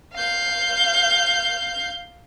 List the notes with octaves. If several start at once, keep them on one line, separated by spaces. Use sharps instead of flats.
F5 G6